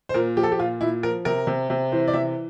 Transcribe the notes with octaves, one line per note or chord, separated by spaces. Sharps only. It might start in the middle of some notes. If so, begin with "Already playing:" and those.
C5
A#2 A#4
F3 G4
A4
G4
A#2 F4
A#2 E4
F3 A#4
C3 A#4
C3
C3
E3 C5
D5
C3 E5